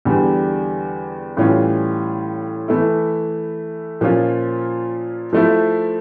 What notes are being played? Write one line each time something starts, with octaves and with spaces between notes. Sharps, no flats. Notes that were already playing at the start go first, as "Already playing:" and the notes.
E2 D3 G3
A2 E3 G3 C#4 F4
E3 A3 E4
A#2 F3 A#3 C#4 F4
F3 A3 E4